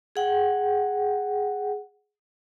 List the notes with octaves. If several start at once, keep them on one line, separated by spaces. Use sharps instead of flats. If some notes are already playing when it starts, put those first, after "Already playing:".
G#4 F#5 G5